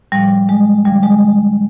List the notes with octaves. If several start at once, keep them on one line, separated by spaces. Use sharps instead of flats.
A2 F3 G3
G#3
D2 D3 F3 G3
G#3